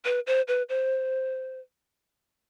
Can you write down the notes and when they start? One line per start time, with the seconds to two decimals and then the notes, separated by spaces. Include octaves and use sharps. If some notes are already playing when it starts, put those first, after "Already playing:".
0.05 B4
0.27 C5
0.48 B4
0.69 C5